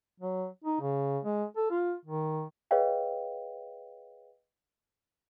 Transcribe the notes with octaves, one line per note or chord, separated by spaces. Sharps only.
F#3
D#4
C#3
G#3
A4
F4
D#3
G#4 B4 C#5 D#5 F5 G5